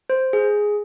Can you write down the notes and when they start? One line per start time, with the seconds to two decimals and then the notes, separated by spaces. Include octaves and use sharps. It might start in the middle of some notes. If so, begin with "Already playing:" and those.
0.10 C5
0.33 G#4